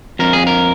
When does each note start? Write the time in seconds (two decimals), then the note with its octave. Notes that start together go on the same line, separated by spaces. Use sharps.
0.19 F2 A#4
0.33 G#4
0.47 A#4